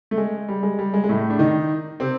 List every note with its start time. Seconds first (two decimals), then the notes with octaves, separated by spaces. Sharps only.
0.11 A3
0.18 G#3
0.49 G3
0.63 G#3
0.79 G3
0.94 G#3
1.04 G#3
1.09 A2 A3
1.30 D4
1.39 D#3 D#4
2.00 C3 C4